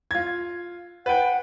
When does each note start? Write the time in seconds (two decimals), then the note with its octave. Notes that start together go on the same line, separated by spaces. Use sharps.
0.11 F4 G#6
1.06 B4 F#5 G5